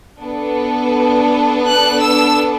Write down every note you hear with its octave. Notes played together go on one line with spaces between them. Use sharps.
B3 D4 A4
F#6
E6